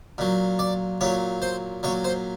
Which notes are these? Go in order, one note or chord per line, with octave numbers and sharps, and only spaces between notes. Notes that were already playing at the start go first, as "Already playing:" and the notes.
A#2 F#3
D5
A#2 F#3 C#5
C5
A#2 F#3 C#5
C5